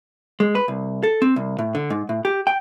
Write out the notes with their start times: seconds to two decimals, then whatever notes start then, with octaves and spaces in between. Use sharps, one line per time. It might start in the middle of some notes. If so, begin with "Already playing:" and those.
0.40 G#3
0.55 B4
0.68 C2
1.03 A4
1.22 C4
1.36 C2
1.59 A2
1.75 D3
1.90 G#2
2.09 A2
2.25 G4
2.47 G5